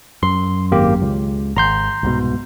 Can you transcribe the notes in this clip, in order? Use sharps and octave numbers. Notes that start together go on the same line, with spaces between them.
F#2 C6
G#1 A#3 G4
C#2
G#1 A#5 C6 G6
C2 G#2 B2